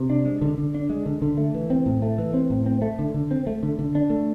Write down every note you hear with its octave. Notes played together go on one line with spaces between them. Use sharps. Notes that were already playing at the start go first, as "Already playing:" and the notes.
Already playing: C3
D4
G#3
D3
D3
D4
G#3
D3
D3
A3
E3
C4
A2
A3
E3
C4
A2
C4
A3
D3
D3
C4
A3
D3
D3
D4
A3